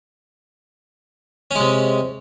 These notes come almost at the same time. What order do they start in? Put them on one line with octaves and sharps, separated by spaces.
C#4 G#3 C3